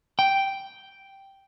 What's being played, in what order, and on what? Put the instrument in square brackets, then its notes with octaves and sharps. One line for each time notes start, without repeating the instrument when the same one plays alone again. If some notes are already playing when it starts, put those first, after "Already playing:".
[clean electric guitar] G5